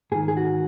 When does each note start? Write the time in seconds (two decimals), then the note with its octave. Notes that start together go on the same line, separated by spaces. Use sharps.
0.12 G#2 G#4
0.15 D#3
0.28 G#4
0.37 F#4